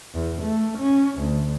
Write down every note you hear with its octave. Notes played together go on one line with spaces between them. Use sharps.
E2
A3
C#4
D2